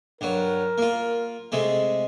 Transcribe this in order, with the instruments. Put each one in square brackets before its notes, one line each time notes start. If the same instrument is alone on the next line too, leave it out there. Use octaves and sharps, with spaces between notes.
[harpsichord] G2 F#3 [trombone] A#4
[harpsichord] A#3 F4
C3 G#3 A3